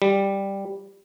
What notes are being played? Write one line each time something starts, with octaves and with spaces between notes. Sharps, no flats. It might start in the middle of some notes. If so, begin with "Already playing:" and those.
G3